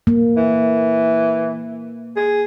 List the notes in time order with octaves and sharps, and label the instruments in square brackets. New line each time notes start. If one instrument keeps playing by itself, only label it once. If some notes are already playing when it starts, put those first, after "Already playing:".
[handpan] A#3
[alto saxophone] E3
G#4